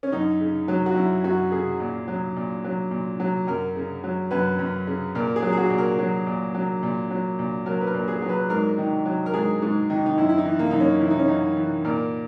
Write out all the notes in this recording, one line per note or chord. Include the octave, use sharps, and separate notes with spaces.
C#4
F#2 D#4
C#3
F#3
F#4
F#2 E4
F#2 F#4
C#3 G#4
A#2
F#3
A#2
F#3
A#2
F#3
F#2 A#4
C#3
F#3
F#2 B4
F#2
C#3
A#2 A#4
G#4
F#3
G#4
F#4
A#2
A#4
F#3
A#2
F#3
A#2
F#3
A#2
F#3 A#4
B4
A#4
A#2
G#4
F#3
B4
G#2 A#4
D#3
F#3
A#4
G#2 G#4
G#2
D#3
D#4
F#2 E4
E4
D#4
E3
A#3
F#2 D#4
C#4
E3 E4
D#4
C#4
F#2 D#4
E3
A#2 A#4